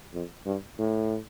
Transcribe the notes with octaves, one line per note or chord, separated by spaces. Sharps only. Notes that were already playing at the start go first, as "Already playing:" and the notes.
F2
G2
A2